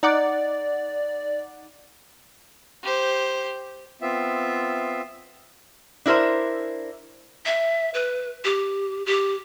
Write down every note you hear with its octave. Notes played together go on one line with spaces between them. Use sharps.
D#4 D5 F#5 D6
G4 C5
B3 C4 F4 E5
D4 E4 A#4 C5 E5
E5
B4
G4
G4